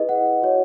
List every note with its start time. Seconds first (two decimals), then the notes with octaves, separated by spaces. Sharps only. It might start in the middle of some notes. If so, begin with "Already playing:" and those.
Already playing: E4 G#4 B4 D#5
0.09 F#5
0.42 F#4 C#5